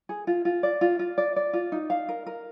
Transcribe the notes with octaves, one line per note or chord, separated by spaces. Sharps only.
G#4
F4
F4
D5
F4
F4
D5
D5
F4
D#4
F5
A#4
A#4